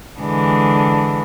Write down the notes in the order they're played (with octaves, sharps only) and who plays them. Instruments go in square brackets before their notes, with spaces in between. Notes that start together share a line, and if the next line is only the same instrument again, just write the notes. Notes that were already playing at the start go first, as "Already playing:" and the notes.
[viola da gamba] D3 E3 G#3